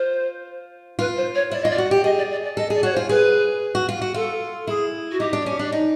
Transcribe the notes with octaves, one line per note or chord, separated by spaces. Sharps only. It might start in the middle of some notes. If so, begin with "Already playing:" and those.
Already playing: F4 C5
F4 B4
C5
C#5
E4 D5
F4 D#5
D5
F#4
G4
G#4 D#5
D5
D5
D5
A4 D#5
G#4 D5
F#4 C#5
C5
F4
G#4 B4
F#4
F4
F#4
F4 A4
E4 G#4
F#4
D#4 G4
D4
C#4
D4
D#4